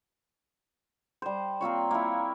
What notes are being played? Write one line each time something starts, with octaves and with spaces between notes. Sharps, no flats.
G3 C5
A#3 C4 F4 C#5
A#3 E4